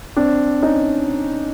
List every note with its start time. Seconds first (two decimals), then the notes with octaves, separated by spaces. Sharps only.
0.16 C4 D4
0.63 C#4 D#4